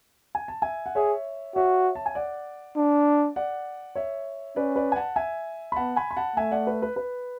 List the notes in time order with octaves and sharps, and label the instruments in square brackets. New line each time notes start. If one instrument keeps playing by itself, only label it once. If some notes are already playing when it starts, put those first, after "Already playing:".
[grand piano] G#5
A5
E5 G#5
F#5
[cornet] G#4 [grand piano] C#5 E5
[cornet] F#4 [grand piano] C#5 E5
[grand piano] A5
G#5
D5 F#5
[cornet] D4
[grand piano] D5 F#5
C#5 E5
[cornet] C#4 [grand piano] B4 D5
[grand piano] B4 D5
G#5
F#5 A5
E5 G#5
B5
[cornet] B3 [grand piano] F#5 A5
[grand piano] G#5 B5
B5
F#5 A5
[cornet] A3 [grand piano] E5 G#5
[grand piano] D5 F#5
B4
B4
B4